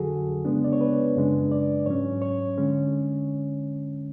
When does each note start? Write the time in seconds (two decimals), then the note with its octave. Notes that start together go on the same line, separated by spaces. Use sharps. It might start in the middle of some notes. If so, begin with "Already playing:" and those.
Already playing: F2 D3 F#3 F#4 G#4 A4
0.45 C#3 G#3 B3 D4
0.64 D5
0.73 C#5
0.81 B4
1.16 F#2 C#3 G#3 D4
1.52 D5
1.86 G#2 F#3 C#4 C#5
2.22 C#5
2.58 D3 G#3 C#4